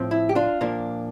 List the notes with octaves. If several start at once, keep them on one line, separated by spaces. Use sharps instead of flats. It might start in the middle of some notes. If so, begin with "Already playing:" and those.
Already playing: A2 F3 C4
E4
G4
D4 F4
A#2 F3 A#3 D4